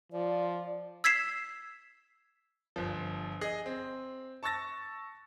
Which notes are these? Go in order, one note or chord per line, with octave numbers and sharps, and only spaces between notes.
F3 D5
E6 G#6 B6 C7 E7
G1 F3
G#4 D#5
C4
A5 C#6 E6 A6 A#6